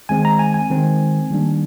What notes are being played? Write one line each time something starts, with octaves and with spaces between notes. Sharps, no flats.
D#3 G#3 C4 G#5
A#5
G#5
G#5
D#3 G#3 C4
D#3 G3 A#3 D4